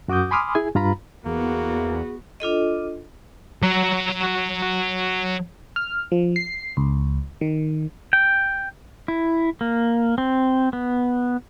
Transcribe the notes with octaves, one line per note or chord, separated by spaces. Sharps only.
F#2 F#4 D6 D#6 G6
G#5 B5 C6 D6 D#6 F6
E4 G#4 G#5
G2 F4 A#5 B5
E2 A#3 B3 F#4 G#4
D4 F4 A4 D#5
F#3 A#5
F6
F3
C7
C#2
D#3
G5
E4
A#3
C4
B3